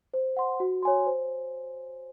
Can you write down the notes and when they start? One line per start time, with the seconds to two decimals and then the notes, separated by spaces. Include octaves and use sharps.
0.14 C5
0.37 F#5 C6
0.60 F#4
0.83 C#5 G#5 C6
1.07 C5